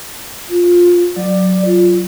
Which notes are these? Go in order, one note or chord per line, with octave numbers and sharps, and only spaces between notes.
F4
F#3 D5
F4